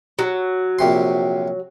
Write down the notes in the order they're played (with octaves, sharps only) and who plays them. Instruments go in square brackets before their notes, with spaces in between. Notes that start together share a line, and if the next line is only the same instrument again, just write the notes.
[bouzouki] F#3
[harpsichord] A#1 C3 C6